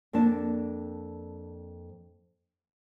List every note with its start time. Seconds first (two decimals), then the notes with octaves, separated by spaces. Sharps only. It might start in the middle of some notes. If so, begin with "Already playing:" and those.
0.13 F2 A#3 D4 A5